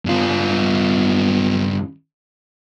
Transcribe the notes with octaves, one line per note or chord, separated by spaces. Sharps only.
G2 F4